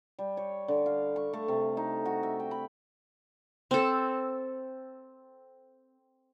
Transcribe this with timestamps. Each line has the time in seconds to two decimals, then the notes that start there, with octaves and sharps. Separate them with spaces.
0.19 G3
0.37 C#5
0.68 D3
0.86 F5
1.16 C#6
1.33 A3
1.48 C3
1.77 D#4
2.05 F#4
2.23 E5
2.40 G5
2.51 B5
3.71 C4 A4